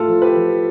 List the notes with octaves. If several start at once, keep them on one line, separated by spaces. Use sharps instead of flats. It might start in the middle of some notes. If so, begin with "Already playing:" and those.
Already playing: A2 F4 A4
F3
G4 B4
F3